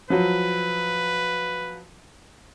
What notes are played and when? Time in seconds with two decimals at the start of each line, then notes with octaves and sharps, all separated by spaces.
0.10 F3 F#3 B4